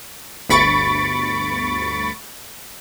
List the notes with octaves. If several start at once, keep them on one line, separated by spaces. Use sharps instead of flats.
G1 D2 B5 C#6 A6 D7